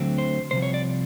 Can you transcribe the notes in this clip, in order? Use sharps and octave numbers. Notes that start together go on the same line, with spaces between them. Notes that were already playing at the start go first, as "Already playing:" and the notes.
Already playing: D2 D3 F#3 A3 C4
C5
C2 C3 F3 C5
C#5
D5